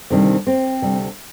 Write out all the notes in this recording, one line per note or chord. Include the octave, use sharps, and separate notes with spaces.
D2 C3 D#3 G3 C4
C4
D2 C3 G3